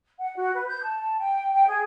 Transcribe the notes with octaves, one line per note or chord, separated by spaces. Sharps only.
F#5
F#4
B4
G6
A5
G5
G5
G#4